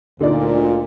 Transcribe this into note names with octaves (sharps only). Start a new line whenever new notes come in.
D2 A#2 D3 D#4 D5